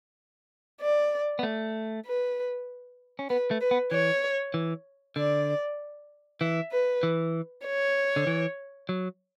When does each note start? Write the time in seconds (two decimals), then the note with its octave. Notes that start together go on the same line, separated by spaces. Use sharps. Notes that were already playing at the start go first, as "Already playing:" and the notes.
0.81 D5
1.39 B3
1.43 A3
2.06 B4
3.19 C#4
3.30 B3 B4
3.51 A3
3.61 B4
3.71 B3
3.91 E3 C#5
4.54 E3
5.16 D3 D5
6.41 E3 E5
6.72 B4
7.03 E3
7.65 C#5
8.16 D3
8.27 E3
8.89 F#3